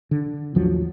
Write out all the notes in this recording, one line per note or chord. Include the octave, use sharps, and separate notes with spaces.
D3
A1 D#2 F3 F#3